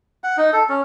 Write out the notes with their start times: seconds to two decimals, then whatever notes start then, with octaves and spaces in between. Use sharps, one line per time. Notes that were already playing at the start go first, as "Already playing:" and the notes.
0.24 F#5
0.37 D#4
0.53 A4
0.69 C#4